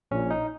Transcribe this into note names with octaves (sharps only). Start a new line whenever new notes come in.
A#1 A#2 C#4
D#4